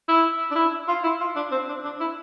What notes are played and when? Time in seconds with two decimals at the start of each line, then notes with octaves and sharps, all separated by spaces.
0.08 E4
0.51 D4
0.56 E4
0.88 F4
1.03 E4
1.20 F4
1.36 D4
1.52 C4
1.69 D4
1.85 D4
2.00 E4